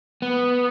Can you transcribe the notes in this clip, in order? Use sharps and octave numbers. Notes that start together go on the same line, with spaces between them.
B3